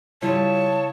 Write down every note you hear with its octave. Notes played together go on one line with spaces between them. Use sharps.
C#3 G3 E4 F4 C#5 A5